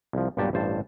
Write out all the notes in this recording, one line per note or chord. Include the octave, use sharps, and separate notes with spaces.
C2 F3
B1 G2 A#2 F#4 G4 A5
A1 G2 C5 A5